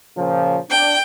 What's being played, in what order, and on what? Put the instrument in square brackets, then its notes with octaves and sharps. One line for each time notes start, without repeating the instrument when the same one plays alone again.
[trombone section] A#2 C#3 F3
[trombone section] D4 [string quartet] G5